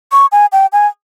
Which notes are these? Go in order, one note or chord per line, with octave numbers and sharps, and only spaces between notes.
C#6
G#5
G5
G#5